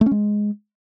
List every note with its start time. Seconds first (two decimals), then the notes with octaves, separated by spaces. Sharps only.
0.01 A3
0.06 C#4
0.11 G#3